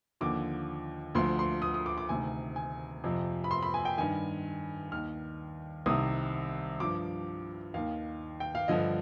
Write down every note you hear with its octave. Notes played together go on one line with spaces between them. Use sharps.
D#2 D3 F3 D6
D2 D3 F3 C6
C6
D#6
D#6
D6
D6
D2 C3 D#3 G#5
G#5
F2 C3 F3
B5
C6
B5
G#5
G5
G2 D#3 G#5
D#2 D#3 F6
C2 C3 D#3 D#6
G2 F3 D6
D#2 D#3 F5
G5
F5
G2 D3 F3 D#5